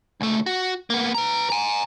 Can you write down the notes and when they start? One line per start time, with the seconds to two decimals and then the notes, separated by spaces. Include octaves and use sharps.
0.21 C#2 A3
0.46 F#4
0.90 A#3 B3
1.14 B4 A#5
1.50 G#5 A#5